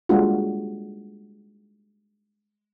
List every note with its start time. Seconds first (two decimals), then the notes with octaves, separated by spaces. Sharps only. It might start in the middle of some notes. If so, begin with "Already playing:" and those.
0.09 G3 G#3 A#3 D4 F4 F#4